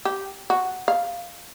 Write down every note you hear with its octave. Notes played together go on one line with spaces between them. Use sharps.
G4
F#4
F5